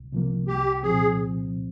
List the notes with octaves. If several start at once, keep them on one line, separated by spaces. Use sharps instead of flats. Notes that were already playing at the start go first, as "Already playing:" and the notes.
Already playing: C2
C3 F3 A#3
C2 G4
A#2 F3 C4 G#4